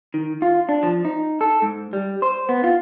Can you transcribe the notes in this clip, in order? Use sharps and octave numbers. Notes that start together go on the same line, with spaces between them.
D#3
F4
D4
F3
D#4
A4
G#2
G3
C5
B3
F4